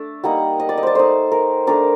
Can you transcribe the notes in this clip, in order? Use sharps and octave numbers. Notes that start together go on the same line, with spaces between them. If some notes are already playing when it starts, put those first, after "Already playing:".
Already playing: A3 D4
G3 A#3 D#4 F#5
D#5
D5
D#5
C5 D5
A3 D#4 C5
A#4
A3 D4 A#4